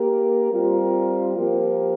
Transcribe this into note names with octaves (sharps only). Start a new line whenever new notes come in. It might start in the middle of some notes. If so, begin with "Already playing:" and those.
Already playing: A#3 G4 A#4
G3 C4 F4 A#4
F3 A#3 G4 A#4